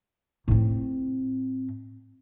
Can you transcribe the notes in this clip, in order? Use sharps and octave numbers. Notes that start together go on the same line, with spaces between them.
A2 C4